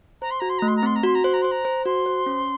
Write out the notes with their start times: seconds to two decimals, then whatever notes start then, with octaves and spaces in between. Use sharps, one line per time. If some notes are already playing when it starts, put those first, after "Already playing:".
0.21 C5 A#5
0.31 C6
0.40 F#4 A#5
0.49 C6
0.58 A3 A#5
0.68 C6
0.76 A#5
0.83 C4 C6
0.96 A#5
1.03 F#4 C6
1.15 A#5
1.24 C5 C6
1.33 A#5
1.42 C5 C6
1.51 A#5
1.65 C5
1.85 F#4 C6
2.06 C5
2.26 C#4